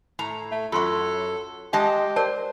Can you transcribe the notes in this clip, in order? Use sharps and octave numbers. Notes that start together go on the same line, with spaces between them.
A2 A#5
A3
F#2 F#3 F4 A4 C6 C#6
G#3 G4 D#5 A5
A#4 C5 D5 A5